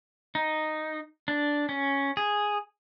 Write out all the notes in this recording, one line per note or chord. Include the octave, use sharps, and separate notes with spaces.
D#4
D4
C#4
G#4